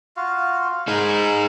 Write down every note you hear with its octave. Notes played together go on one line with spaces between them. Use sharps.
F4 F#4 F5
D#4 G#4 A#4 G#5 B5